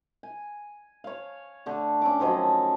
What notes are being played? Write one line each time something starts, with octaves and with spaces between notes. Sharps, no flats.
G#5
C#5 F5
D3 A3 D4
C#4 A4 D6
D#3 F3 F#3 D#5